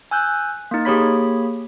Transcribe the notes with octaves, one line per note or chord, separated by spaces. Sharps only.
G#5 E6 F#6 G6
A#3 D#4
A#3 G4 G#4 C#5 B5 B6